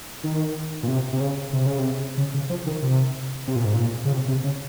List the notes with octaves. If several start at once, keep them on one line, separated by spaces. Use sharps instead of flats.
D#3
A#2
C3
C3
C#3
C3
C#3
C3
C#3
C#3
F3
D#3
C3
C3
A#2
G#2
A#2
C#3
C3
C3
C#3